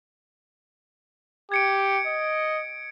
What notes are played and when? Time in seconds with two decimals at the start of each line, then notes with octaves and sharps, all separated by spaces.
1.52 G4 G#6 C#7 D7
2.07 D#5